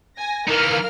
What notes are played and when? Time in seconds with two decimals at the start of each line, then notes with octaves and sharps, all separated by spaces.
0.16 G#5 A#6
0.48 E3 D#4 A#4 F5 F6